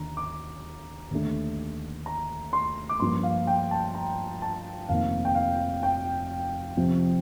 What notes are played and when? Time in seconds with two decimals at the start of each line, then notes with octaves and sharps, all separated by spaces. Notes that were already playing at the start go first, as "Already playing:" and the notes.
Already playing: D#2 D3 A#5
0.17 D6
1.11 D#2 D3 A3
2.06 A#5
2.53 C6
2.89 D6
3.00 G2 F3 A#3 C6
3.23 F5
3.47 G5
3.71 A5
3.95 A#5
4.42 A5
4.89 F1 F2 D#3 A#3 F5
5.25 G5
5.35 F5
5.83 G5
6.77 F2 C3 F3